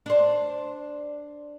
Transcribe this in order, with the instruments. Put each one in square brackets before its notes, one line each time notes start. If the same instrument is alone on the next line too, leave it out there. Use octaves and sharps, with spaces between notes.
[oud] D4 C5